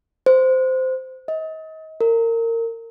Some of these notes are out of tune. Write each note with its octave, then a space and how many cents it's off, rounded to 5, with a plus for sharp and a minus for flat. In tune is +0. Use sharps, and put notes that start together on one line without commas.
C5 -15
D#5 +35
A#4 -25